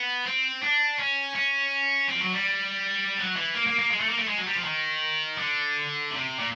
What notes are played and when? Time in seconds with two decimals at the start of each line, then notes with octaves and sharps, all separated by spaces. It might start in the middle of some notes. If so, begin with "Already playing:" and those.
Already playing: B3
0.26 C4
0.62 D4
0.99 C#4
1.35 C#4
2.09 C4
2.15 F3
2.21 F#3
2.33 G3
3.18 F#3
3.36 E3
3.55 A#3
3.67 A#3
3.79 A#3
3.91 G#3
4.00 A3
4.10 A#3
4.19 A3
4.28 G#3
4.38 F#3
4.46 G3
4.55 F3
4.64 D#3
5.38 D3
6.11 C3
6.39 A#2